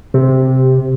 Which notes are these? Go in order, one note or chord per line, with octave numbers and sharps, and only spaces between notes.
C3